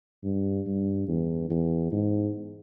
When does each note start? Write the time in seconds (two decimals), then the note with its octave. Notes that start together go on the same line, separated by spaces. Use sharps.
0.24 G2
0.66 G2
1.08 E2
1.50 E2
1.92 G#2